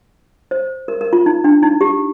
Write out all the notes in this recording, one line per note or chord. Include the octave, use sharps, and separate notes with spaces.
C5
A#4
A#4
F4
D#4
D4
D#4
G4